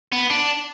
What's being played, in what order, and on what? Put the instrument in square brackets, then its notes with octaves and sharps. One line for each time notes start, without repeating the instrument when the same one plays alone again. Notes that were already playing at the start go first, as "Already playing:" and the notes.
[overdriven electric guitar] B3
D4